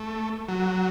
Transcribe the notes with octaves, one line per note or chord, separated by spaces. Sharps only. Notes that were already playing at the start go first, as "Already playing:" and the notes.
Already playing: A3
F#3